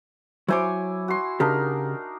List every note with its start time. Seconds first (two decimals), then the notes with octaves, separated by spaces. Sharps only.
0.48 F#3 E4 C5 C#5 G#5 D6
1.08 F#4 C6
1.40 C#3 D4 D#4 G4 A#4